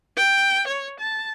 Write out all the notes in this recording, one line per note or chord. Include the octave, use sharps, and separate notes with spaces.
G5
C#5
A5